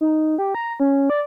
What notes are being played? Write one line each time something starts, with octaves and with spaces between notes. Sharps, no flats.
D#4
G4
A#5
C#4
D5